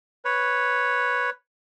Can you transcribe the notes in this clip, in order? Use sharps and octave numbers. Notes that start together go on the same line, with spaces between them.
B4 C#5